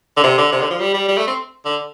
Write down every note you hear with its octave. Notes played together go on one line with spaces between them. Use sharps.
D3
C3
D3
C3
D3
F3
G3
G3
G3
A3
C4
D3